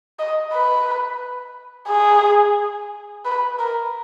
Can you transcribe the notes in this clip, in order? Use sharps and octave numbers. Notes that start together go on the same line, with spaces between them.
D#5
B4
G#4
B4
A#4